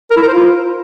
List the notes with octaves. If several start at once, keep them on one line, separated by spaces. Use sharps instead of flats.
A#4
E4
A#4
C5
F4